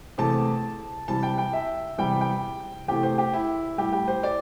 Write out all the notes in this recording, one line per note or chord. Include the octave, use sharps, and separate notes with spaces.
E2 C3 A3 A5
C3 E3 G3 A5
G5
G5
E5
E2 C3 E3 G3 G5
G5
E2 C3 E3 A3 G4
C5
G4
E4
A2 G3 G4
G4
C5
D5